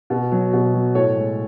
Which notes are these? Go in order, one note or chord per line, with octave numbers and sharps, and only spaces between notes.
B2
F#3
B2
F#3
A2 A4 C#5
G#3